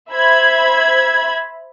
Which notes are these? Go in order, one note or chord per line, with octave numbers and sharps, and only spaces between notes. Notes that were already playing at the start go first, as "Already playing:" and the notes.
C5 E5 B5 G#6